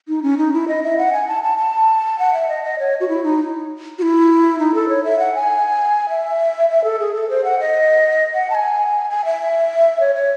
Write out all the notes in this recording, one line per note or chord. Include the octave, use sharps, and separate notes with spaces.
D#4
C#4
D#4
E4
D#5
E5
F#5
G#5
A5
A5
A5
F#5
E5
D#5
D#5
C#5
F#4
E4
D#4
F#4
E4
D#4
A4
C#5
E5
F#5
G#5
E5
E5
A4
G#4
A4
C5
F#5
D#5
F#5
A5
G#5
G#5
E5
C#5
C#5